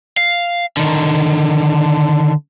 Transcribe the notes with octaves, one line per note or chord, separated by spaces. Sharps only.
F5
D3 D#3